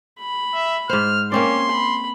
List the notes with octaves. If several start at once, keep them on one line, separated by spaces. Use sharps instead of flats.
B5
E5
G#2 C5 F6
A#3 C4 C#4 D5 C6
B5